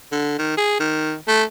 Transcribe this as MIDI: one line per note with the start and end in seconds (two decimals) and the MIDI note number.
0.12 0.35 50
0.39 0.56 51
0.57 0.77 68
0.80 1.15 51
1.28 1.43 57